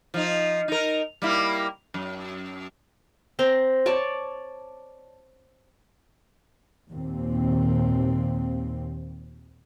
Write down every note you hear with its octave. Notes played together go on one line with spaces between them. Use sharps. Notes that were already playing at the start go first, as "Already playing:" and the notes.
F3 D#4
D#4 A#4
G3 A#3 E4
F#2
C4 C5 A#5
C#5 D5 A5
D#2 A#2 C4